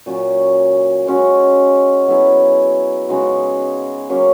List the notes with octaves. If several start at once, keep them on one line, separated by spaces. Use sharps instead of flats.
A#2 F#3 C#4
G#3 C#4 F#4
F#3 B3 E4 G#4
C#3 G#3 D#4 F#4
F#3 A#3 C#4